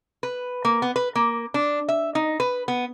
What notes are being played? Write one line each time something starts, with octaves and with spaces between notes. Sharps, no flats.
B4
A#3
B3
B4
A#3
D4
E5
D#4
B4
B3